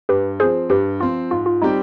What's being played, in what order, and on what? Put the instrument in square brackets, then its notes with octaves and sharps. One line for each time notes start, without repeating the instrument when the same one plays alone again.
[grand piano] G2 [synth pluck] G4 B4
[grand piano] F3 C4 [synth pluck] G#4 C5
[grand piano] G2 [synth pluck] G4 B4
[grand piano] F3 C4 [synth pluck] F4
[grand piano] G#2 [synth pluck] F4
[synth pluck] F4
[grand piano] G3 C4 G4 [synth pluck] D#4